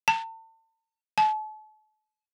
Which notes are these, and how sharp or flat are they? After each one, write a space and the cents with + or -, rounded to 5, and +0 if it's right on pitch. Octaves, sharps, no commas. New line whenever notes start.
A5 +40
A5 -40